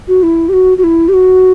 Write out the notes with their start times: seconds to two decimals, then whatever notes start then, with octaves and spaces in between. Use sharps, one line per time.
0.08 F#4
0.23 E4
0.49 G4
0.53 F#4
0.78 F#4
0.84 E4
1.08 G4
1.14 F#4